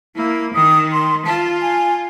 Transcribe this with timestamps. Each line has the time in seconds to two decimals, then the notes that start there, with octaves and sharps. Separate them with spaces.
0.16 A#3 E4
0.54 D#3 D#6
0.92 C6
1.26 F4 A5
1.62 G#5